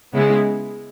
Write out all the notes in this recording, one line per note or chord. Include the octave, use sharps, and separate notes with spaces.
C#3 G#3 B3 E4